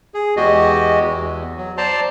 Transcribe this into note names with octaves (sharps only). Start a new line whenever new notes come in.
G#4
E2 G#3 F#4 G4 D#5
E2
F#3
C5 D5 A5 A#5 C6